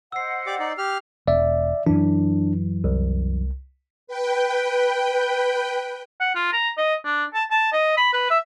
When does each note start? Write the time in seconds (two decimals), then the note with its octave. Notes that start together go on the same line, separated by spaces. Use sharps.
0.12 C5 D#5 F#5 E6 C7
0.46 G4 D5 D6
0.59 D#4 D5
0.78 G4 F6
1.28 E1 D5 E5
1.87 F#2 E3 D4
2.84 C2
4.07 B4 G5
6.20 F#5
6.35 F4
6.53 A#5
6.78 D#5
7.05 D4
7.34 A5
7.50 A5
7.73 D#5
7.97 B5
8.13 B4
8.30 E5